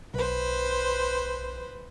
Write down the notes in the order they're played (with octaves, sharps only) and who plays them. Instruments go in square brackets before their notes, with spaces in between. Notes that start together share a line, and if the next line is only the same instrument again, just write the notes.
[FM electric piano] B1 [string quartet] B4 C5